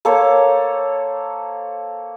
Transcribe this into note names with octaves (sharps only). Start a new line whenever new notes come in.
A#3 A4 C5 C#5